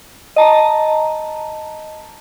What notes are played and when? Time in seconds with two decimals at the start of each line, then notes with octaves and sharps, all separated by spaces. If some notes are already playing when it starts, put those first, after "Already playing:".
0.36 D#5 A5 A#5